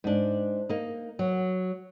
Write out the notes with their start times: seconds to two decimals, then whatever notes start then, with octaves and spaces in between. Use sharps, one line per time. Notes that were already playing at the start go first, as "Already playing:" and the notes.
0.04 G#2 D4
0.69 A#3 D#4
1.19 F#3